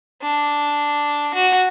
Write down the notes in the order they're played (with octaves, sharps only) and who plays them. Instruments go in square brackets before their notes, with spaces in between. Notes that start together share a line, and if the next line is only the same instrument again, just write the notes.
[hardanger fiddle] D4
F#4